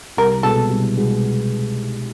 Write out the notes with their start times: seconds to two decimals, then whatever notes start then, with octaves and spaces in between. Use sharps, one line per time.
0.17 C2 A#4
0.43 B2 G#3 B3 A4
0.70 C2
0.95 B2 G#3 B3